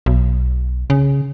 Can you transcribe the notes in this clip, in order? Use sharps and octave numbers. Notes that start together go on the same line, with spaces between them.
B1
C#3